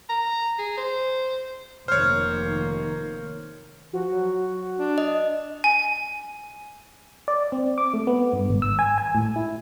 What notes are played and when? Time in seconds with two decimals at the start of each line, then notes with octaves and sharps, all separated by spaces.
0.09 A#5
0.59 G#4
0.77 C5
1.88 F1 D#3 A#3 C5 C#5 F6
3.93 F3 F#4
4.11 F#3
4.79 D4
4.98 D#5
5.64 G#5
7.28 D5
7.52 C4
7.78 D6
7.94 A3
8.07 B3
8.33 G2
8.50 G#1
8.62 E6
8.79 G#5
8.98 G#5
9.15 A2
9.36 E4